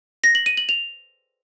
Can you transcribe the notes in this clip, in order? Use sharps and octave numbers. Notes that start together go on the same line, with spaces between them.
A#6
F#7
D#7
F#7
F7